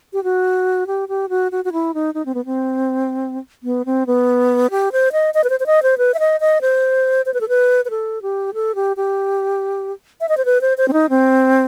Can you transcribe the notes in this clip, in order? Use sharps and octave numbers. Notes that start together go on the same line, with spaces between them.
G4
F#4
G4
G4
F#4
F#4
F#4
E4
D#4
D#4
C4
B3
C4
B3
C4
B3
G4
C5
D#5
D#5
B4
C5
C5
D#5
C5
B4
E5
D#5
D#5
C5
C5
B4
A4
B4
B4
A4
G4
A4
G4
G4
E5
D#5
C5
B4
C5
C5
C4
D#4
C4